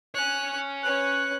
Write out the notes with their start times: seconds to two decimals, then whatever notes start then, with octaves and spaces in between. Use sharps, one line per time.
0.15 C#5 G#5 F#6
0.83 C#4 B4 F#6